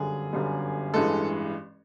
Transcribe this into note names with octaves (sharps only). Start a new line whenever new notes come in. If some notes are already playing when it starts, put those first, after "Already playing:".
Already playing: G1 F#2 D3 G3 G#4
G1 F#2 D3 G3
A1 G2 E3 G#3 A4